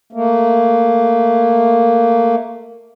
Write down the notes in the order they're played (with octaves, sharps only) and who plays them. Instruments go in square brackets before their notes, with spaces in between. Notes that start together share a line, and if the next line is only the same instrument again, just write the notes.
[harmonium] A3 A#3